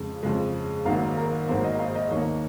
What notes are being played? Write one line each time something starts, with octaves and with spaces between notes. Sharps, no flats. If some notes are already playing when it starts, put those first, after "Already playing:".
Already playing: F2 C#3 G#3
F2 C#3 G#3
G#1 G#2 D#3 F#3 A#3 F5
A#4
G#1 G#2 D#3 F#3 A#3 C5
D#5
F5
D#5
D#2 D#3 A#3 C#5